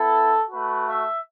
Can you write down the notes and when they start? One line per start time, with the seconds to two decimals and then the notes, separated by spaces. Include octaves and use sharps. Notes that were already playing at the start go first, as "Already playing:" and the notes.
Already playing: B3 E4 A4
0.50 A3 F#4 B4
0.86 E5